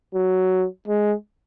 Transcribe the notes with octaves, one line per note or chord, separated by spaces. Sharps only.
F#3
G#3